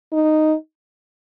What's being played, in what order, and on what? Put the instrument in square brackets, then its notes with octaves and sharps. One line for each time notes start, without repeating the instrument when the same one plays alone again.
[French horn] D#4